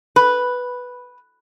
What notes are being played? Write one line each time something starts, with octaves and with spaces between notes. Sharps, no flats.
B4